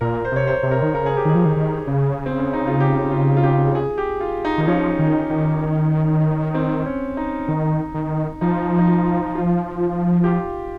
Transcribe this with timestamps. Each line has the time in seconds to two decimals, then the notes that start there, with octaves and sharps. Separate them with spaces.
0.01 A#2 A#4
0.25 C5
0.32 C3 C#5
0.47 C5
0.63 C3
0.71 A#4
0.82 D#3
0.94 C#3 A#4
1.06 G#4
1.17 G4
1.25 D#3 G#4
1.35 F3
1.45 D#3
1.56 D#3
1.87 C#3
2.26 C4
2.39 C#4
2.53 D#4
2.67 F4
2.80 G4
3.11 F4
3.37 F4
3.44 G4
3.75 G#4
3.98 G4
4.20 F4
4.45 D#4
4.58 D#3 D#4
4.68 F3 C#4
4.99 D#3
5.30 D#3
6.54 C4
6.86 C#4
7.17 D#4
7.48 D#3
7.94 D#3
8.41 F3 D#4
8.79 D#4
8.88 F4
9.35 F4
10.24 G4
10.28 F4